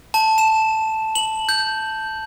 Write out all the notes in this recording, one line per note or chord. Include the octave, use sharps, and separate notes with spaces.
A5
E7
F#7
G6